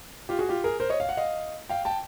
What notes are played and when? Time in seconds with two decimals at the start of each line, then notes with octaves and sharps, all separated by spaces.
0.29 F4 G4
0.39 F#4 G#4
0.49 F4 G4
0.64 G#4 A#4
0.80 A#4 C5
0.90 C#5 D#5
1.00 F5
1.09 F#5
1.17 D#5 F5
1.69 F5 G5
1.85 G5 A5